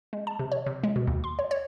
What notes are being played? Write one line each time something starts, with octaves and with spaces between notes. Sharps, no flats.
G#3
A5
C3
C#5
C3
G#3
B2
D#2
C6
C#5
C#5